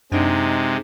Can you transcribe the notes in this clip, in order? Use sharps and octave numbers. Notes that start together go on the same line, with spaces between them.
F#2 C3 G#3 D4 D#4